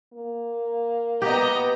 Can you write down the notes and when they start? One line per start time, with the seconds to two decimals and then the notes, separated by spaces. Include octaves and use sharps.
0.13 A#3
1.22 B3 G4 D#5 A#5